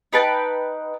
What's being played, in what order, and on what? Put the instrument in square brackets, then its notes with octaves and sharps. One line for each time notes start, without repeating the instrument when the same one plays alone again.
[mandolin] D#4 B4 G5 A5